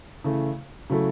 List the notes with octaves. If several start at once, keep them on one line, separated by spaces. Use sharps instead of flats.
C#3 E3 A3
C#3 F#3 A3 E4 A4